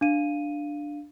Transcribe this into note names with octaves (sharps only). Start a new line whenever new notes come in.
D4 F5 D#7